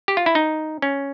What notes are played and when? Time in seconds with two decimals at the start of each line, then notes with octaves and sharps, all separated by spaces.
0.08 G4
0.17 F4
0.26 E4
0.35 D#4
0.82 C#4